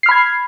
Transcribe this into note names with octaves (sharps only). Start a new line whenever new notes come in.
B5 F6 G#6 C7